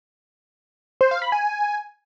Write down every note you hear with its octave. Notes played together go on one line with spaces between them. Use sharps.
C5
F5
B5
G#5